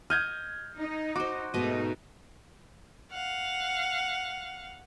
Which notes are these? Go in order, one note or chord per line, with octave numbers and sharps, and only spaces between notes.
D#5 F6 G6 G#6
D#4
F#4 C5 D6
G#2 B2 A3 D#4 D#5
F5 F#5